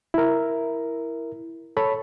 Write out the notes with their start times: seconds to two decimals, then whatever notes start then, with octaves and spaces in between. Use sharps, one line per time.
0.14 E4 A#4
1.77 A4 C#5 B5